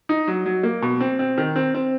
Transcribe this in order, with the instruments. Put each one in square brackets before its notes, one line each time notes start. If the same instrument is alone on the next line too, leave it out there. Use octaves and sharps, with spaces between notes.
[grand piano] D#4
F#3
F#3
A#3
B2
C4
C4
D#3
C4
C4